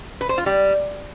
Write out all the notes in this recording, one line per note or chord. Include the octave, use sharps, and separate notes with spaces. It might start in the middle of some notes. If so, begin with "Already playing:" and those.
B4
C5
F4
G3